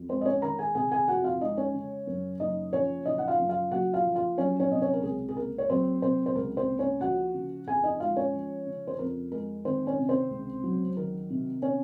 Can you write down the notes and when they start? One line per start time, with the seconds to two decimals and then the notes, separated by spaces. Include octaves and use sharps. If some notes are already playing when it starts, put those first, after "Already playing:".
Already playing: F2
0.09 G#3 C4 C5
0.21 D#5
0.26 C#4 C#5
0.42 D#3 A#4 A#5
0.59 G#4 G#5
0.75 C3 G#4 G#5
0.92 G#4 G#5
1.08 F2 F#4 F#5
1.24 F4 F5
1.41 G#3 D#4 D#5
1.57 C#4 C#5
1.74 C#3
2.07 F#2
2.40 F#1 D#4 D#5
2.73 F3 C#4 C#5
3.05 C#3 D#4 D#5
3.18 F#5
3.28 F4 F5
3.39 F#2
3.49 F4 F5
3.71 F#1 F#4 F#5
3.93 F4 F5
4.05 F3
4.15 F4 F5
4.38 F#3 C#4 C#5
4.60 C#4 C#5
4.71 C3 D#5
4.82 C#4 C#5
4.94 A#4
5.03 C#2 G#4
5.29 G#4
5.37 A#3 A#4
5.58 C#5
5.69 F#3 C4 C5
6.02 C3 C4 C5
6.26 C5
6.36 C#2 A#4
6.57 C4 C5
6.68 A#3
6.79 C#4 C#5
7.01 F3 F#4 F#5
7.34 C#3
7.67 F2 G#4 G#5
7.84 D#4 D#5
8.00 G#3 F4 F5
8.16 C#4 C#5
8.33 F3
8.66 C#3
8.87 C5
8.99 F2 A#4
9.32 G#3 A#4
9.65 D#3 C4 C5
9.87 C#4 C#5
9.98 C3
10.09 C4 C5
10.31 C#2
10.63 F#3
10.97 D#3 A#4
11.30 C3
11.62 C#4 C#5